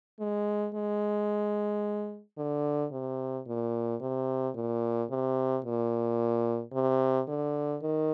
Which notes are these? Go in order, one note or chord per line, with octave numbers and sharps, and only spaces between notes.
G#3
G#3
D3
C3
A#2
C3
A#2
C3
A#2
C3
D3
D#3